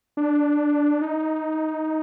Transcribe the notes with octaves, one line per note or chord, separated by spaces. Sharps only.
D4
D#4